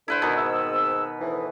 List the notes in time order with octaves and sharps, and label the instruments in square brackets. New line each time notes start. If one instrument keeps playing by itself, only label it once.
[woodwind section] D3 [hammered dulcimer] E4 B4 C5
[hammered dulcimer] B2 D#3
[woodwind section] G#2 C4 E6
D2 A2 E3